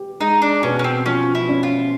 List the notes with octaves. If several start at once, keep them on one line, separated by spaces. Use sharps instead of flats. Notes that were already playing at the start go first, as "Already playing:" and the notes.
Already playing: G4
G#3 D#4
D4
B2 C#4
C#4
C4
F3 C#4
E4
C#4
F4